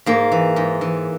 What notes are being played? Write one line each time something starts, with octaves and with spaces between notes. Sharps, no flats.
G#2 A#3
E3
G#2
E3